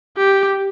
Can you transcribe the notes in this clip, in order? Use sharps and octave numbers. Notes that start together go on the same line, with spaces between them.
G4